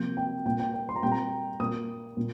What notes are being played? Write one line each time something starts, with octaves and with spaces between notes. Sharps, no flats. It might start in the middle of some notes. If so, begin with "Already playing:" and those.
Already playing: C3 F3 A#3 G6
G5
A#2 A#3 G5
G5
G5
C6
A#5
A#2 G3 C4 G5
A#5
A#2 A#3 D#6
A#2